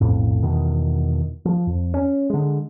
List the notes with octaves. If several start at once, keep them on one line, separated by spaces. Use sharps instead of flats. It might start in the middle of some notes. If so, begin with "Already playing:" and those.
B1 F2 A2
E2 B2 D#3
F3
F2
C#4
D3 G#3